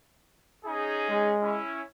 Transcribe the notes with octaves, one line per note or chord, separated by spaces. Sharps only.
C#4 D#4 G#4
G#3
C#4 E4